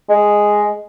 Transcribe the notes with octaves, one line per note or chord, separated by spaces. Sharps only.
G#3